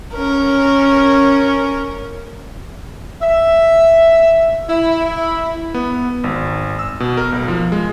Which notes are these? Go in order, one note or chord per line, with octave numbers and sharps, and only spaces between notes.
C#4 A#4
E5
E4
B3
G#1
E6
B2
A#4
B1
F3
G#3